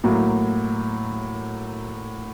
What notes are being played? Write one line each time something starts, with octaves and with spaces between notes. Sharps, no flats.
A2 F#3 A#3